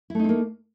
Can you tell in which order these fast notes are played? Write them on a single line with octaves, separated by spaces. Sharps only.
E4 A3 D#4 C4 A#3